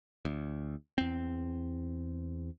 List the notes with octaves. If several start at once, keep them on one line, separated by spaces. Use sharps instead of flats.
D2
E2 C4